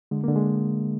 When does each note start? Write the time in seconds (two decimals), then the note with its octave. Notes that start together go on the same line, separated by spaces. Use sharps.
0.11 D3 G#3
0.24 A#3
0.28 D3
0.36 G#3